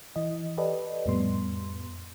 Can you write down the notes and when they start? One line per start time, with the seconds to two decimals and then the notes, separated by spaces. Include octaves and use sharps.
0.16 E3 D#5
0.58 G4 A4 B4 D5 D#5
1.06 F2 A2 G3 B3 C6